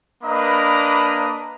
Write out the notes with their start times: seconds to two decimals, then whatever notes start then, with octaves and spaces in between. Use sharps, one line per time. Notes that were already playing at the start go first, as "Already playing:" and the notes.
0.24 A#3 D4 B4 D#5 A#5 B5